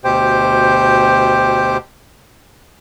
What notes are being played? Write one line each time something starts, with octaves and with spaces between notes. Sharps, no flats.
D2 B2 G4 C5 G5